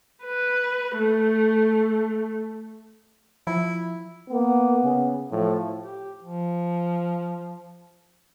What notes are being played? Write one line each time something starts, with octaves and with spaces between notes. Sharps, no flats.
B4
A3
F3 E4
A#3 B3
C#3
A2 F3
G4
F3